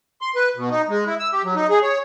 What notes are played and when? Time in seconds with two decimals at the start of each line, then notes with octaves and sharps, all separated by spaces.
0.21 C6
0.35 B4
0.56 B2
0.70 D#4
0.89 G#3
1.06 E4
1.19 E6
1.32 G4
1.44 F#3
1.56 D#4
1.70 G#4
1.82 C#5